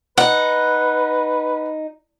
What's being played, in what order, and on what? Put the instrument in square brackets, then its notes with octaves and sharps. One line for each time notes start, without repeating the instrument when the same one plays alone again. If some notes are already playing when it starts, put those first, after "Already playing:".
[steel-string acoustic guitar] D#4 [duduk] B4 [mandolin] F#5